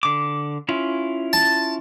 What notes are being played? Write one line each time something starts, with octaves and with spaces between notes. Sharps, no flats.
D3 D6
C#4 E4 F4
A5